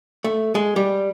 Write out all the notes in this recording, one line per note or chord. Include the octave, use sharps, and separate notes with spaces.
A3
G#3
G3